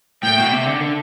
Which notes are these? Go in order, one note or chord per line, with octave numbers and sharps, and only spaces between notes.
A2 G5
B2
C3
D3
D3